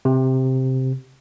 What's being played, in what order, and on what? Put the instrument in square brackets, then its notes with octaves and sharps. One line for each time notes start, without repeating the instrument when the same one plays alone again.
[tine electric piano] C3